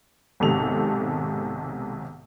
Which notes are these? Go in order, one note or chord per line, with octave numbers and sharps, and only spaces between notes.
B1 G#2 C3 D#3 A4 F7